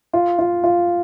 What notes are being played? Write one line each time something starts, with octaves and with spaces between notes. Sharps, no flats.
F4
F4
F4